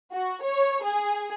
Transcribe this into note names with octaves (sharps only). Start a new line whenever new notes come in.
F#4
C#5
G#4